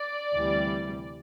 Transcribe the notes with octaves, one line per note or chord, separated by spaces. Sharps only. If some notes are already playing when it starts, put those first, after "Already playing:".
Already playing: D5
D2 C3 E3 G3